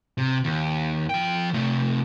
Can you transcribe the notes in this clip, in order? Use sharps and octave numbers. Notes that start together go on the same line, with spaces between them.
C3
D#2
F3 G5
C3 A3